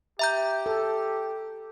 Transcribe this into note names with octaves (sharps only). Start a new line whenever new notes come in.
G4 E5 A#5 G6
A4